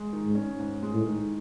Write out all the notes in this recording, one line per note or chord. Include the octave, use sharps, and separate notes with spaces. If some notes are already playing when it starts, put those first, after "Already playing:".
Already playing: G#3
D#3
G#2
C#4
G#2
G#3
A2
D#3